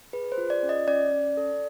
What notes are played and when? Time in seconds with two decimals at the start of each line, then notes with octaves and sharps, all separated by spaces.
0.13 G#4 B4
0.32 C5
0.38 F4
0.50 D5
0.63 C#4
0.69 D#5
0.87 C#4 D5
1.12 C#4
1.37 A4